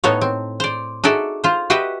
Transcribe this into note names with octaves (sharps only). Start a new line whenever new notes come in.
A2 B3 D#4 A4 C#5
C4
C5 D5
D#4 F#4 G#4 A4 D5 E5
F4 C5
F#4 G4 B4 D#5 E5